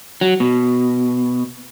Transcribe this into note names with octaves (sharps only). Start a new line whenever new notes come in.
F#3
B2